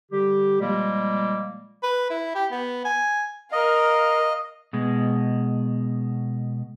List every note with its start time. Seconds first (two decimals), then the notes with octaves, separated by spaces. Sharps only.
0.11 D3 G3 G4
0.60 A#2 F3 G3 G#3 A#3
1.83 B4
2.10 E4
2.35 G4
2.52 B3
2.85 G#5
3.52 A#4 D#5 F5
4.73 B2 G#3